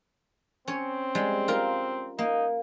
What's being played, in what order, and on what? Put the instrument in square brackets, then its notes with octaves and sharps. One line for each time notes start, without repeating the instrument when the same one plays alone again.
[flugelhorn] C4 [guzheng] C#4 C#5
[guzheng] G3 G#3
F4 A#4
[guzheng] A#3 [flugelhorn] D#4